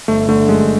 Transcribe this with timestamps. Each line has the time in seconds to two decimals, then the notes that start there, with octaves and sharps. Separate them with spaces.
0.08 G1 A3
0.29 D3 A3
0.49 F#2 G#3